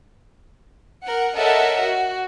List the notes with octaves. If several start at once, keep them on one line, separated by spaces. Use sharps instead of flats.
A#4 F#5
A4 A#4 C#5 D#5 E5 F#5
F#4